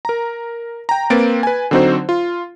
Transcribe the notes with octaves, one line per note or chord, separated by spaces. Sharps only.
A#4 A#5
G5 A#5
A#3 C4 B4 A6 D7
B4 G#5
D3 F#3 C4 D#4 F#4 C5
F4